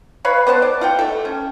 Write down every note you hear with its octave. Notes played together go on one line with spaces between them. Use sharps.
B4 C#5 F5 B5
B3 C5 D#5 A5
D5
F4 F#5 G5
A3 A4
C#4